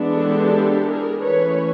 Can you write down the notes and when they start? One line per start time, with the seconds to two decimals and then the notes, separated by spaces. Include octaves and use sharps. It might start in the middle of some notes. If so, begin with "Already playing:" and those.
Already playing: E3 G#3 B3 D4
0.15 G4 A4
0.86 G#4 A#4
1.22 E3 A3 C#4 B4 C#5